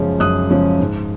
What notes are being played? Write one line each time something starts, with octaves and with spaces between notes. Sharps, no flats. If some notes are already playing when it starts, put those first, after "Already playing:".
Already playing: F#2 C#3 F3 G#3 C#4
F#2 D#6 F#6
C#3 F3 G#3 C#4
G#2